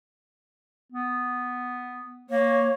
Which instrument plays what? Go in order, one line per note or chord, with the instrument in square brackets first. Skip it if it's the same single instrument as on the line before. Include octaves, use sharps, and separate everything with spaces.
[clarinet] B3
[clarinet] A#3 [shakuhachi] C#5